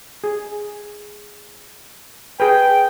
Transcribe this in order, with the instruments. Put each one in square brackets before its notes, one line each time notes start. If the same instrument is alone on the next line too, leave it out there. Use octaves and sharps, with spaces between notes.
[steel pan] G#4
[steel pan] G#4 B4 [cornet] G5